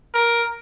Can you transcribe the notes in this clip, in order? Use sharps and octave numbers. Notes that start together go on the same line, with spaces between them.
A#4